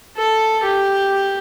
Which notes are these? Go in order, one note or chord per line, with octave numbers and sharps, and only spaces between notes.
A4
G4